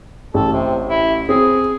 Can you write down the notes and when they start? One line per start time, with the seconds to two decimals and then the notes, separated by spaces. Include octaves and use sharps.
0.34 A1 A4
0.53 C3
0.89 E4
1.29 C4 G#4